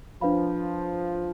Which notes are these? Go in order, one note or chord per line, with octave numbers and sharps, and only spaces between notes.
F3 D4 F4 B4 F5 B5